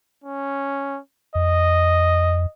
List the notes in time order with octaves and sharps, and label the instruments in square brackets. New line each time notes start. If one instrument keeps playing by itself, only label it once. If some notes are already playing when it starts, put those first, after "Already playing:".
[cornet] C#4
[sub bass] F2 [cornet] D#5